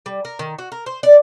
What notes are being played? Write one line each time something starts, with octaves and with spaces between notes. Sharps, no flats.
G3
A#4
D#3
F#4
A#4
C5
D5